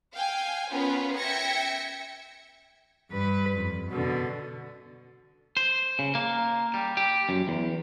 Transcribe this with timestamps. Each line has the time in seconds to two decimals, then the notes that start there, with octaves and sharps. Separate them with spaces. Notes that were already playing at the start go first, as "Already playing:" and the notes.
0.13 F5 G5 G#5
0.71 B3 C#4 F4 A#4 B4
1.17 E5 G5 G#6 A#6 C#7
3.10 G2 B4
3.53 F2
3.89 B2 D3
5.57 C5
5.99 C#3
6.15 A#3
6.74 G3
6.97 G4
7.29 F#2
7.48 E2